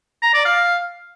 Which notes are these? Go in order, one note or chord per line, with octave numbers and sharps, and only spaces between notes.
A#5
D5
F5